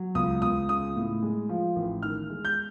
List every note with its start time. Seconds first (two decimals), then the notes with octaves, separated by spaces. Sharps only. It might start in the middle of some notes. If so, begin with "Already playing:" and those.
Already playing: F#3
0.15 C#2 D#6
0.42 C#2 D#6
0.69 C#3 D#6
0.96 A2
1.22 G#3
1.49 F3
1.76 A1
2.03 D#3 F6
2.29 G#3
2.45 G6